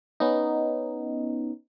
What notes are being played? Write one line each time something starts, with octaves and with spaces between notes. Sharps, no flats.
B3 C#4 D#4